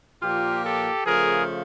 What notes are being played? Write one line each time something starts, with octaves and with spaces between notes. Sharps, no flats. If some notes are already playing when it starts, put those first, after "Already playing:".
A#2 F3 A#3 F4 G4
G4 A4
C#3 F3 A3 G#4 A#4